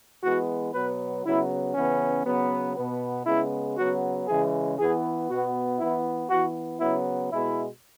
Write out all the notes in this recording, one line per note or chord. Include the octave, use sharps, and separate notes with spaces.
E3 G#3 B3 F#4
B2 F#3 B3 B4
C#3 F#3 B3 E4
C#3 E3 B3 C#4
C#3 F#3 B3
B2 B3
C#3 G#3 B3 E4
C#3 F#3 B3 F#4
C#3 E3 G#3 G#4
E3 B3 G#4
B2 B3 F#4
E3 B3 E4
E3 B3 F#4
C#3 F#3 B3 E4
B2 G#3 B3 E4